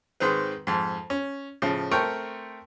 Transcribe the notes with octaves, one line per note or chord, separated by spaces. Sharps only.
G#2 D#3 G#3 C4 B4
F2 G#2
C#4
A2 C#3 F3
A3 C4 A#4 G5 C#6